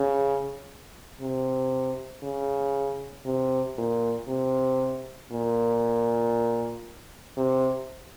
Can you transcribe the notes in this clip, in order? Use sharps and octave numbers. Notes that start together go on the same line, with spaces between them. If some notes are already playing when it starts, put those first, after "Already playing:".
Already playing: C#3
C3
C#3
C3
A#2
C3
A#2
C3